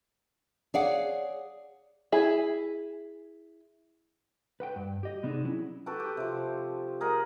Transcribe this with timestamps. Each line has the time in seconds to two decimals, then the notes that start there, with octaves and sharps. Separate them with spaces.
0.74 G#4 C#5 D5 F5 F#5
2.12 E4 G#4
4.60 B4 F#5 G5
4.76 G2
5.03 G4 D#5
5.23 C3 B3 C4 D4 D#4 G#4
5.44 F#3 C#4 E4
5.86 F#4 A4 B4 G5
6.00 G4
6.17 C3 F3
7.01 G#4 A#4 D#5 F#5